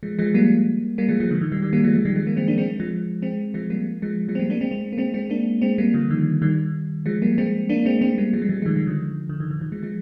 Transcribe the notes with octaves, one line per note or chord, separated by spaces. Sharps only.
F3 G#3
F3 G#3
G3 A#3
G3 A#3
F3 G#3
F3 G#3
D3 F3
D#3
D#3 G3
D#3 G3
G3 A#3
F3 G#3
F3 G#3
D#3 G3
F3 G#3
G3 A#3
G#3 C4
A#3 D4
G#3 C4
F3 G#3
G#3 C4
F3 G#3
G3 A#3
F3 G#3
F3 G#3
C4
G3 A#3
A#3 D4
G#3 C4
G#3 C4
A#3
G#3 C4
G#3 C4
A#3 D4
G#3 C4
G3 A#3
D3 F3
D#3 G3
D#3 G3
F3 G#3
G3 A#3
G#3 C4
A#3 D4
G#3 C4
G#3 C4
G3 A#3
F3 G#3
G3
F3 G#3
G#3
D#3 G3
D#3 G3
D3 F3
D3
D#3
D#3
D#3
F3 G#3
F3 G#3